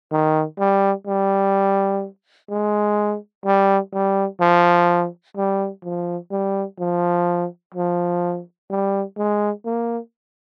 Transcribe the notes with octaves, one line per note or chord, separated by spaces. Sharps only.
D#3
G3
G3
G#3
G3
G3
F3
G3
F3
G3
F3
F3
G3
G#3
A#3